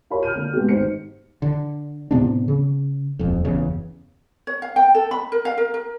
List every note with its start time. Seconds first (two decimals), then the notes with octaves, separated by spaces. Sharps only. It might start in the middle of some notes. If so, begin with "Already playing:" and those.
0.10 F4 G4 A#4 C#5 B5
0.23 F6 G6 D#7
0.35 D3 A#3
0.53 G#2 C3 A3 B3 G4
0.69 G#1 D#4 C5 C#7
1.42 D3
2.11 A2 C3 B3 D4
2.48 C#3
3.19 D#1 F2
3.45 F#1 E2 C#3
4.47 C#5
4.62 F5
4.76 G5
4.95 A4
5.11 B5
5.32 A#4
5.45 F5
5.58 A#4
5.74 A#4